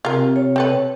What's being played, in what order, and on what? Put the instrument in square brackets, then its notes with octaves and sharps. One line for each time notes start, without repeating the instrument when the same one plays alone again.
[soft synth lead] C3 [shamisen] F4 A#4
[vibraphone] C#5
[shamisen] C4 A4 B4